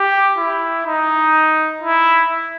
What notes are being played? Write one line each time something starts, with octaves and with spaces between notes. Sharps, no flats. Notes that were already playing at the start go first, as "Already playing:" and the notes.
Already playing: G4
E4
D#4
E4